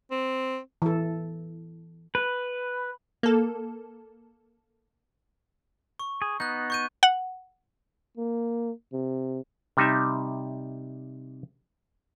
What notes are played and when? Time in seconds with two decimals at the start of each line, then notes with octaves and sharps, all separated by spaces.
0.11 C4
0.82 E3 A4
2.15 B4
3.23 A#3 A4
5.99 C#6
6.22 G#4
6.40 B3 D#4 F#6 G6
6.70 C#6 G6 D#7
7.03 F#5
8.17 A#3
8.93 C3
9.77 C3 G3 D#4 E5